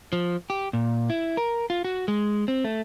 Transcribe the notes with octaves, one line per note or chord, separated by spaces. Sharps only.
F3
G4
A#2
E4
A#4
F4
F#4
G#3
C4
A3